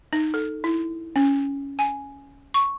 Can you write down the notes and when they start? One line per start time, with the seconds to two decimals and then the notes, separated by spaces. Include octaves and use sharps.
0.13 D#4
0.34 A4
0.64 E4
1.16 C#4
1.79 G#5
2.54 C#6